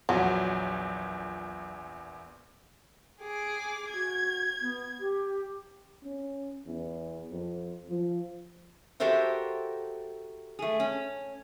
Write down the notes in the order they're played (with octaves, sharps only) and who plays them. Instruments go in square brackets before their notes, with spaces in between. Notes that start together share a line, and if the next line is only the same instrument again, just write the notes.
[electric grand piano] A#1 E2 A#2 [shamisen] F#3
[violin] G#4 D6
[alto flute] F#4 [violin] G#6
[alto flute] B3
G4
[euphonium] C#4
E2
F2
F3
[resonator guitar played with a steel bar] F#4 G4 A4 A#4 C5 E5
A3 G#4
C#4